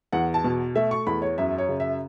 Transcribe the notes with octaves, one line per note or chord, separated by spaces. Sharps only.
E2 F#5
A5
B2
A3 E5
C#6
E2 B5
C#5
F#2 E5
C#5
C#3
E5